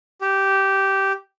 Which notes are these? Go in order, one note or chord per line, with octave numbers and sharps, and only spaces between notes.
G4